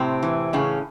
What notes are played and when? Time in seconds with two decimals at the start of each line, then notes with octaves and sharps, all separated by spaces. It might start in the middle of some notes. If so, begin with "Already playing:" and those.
Already playing: A2 C3 C4
0.23 E3
0.53 A2 C#3 C#4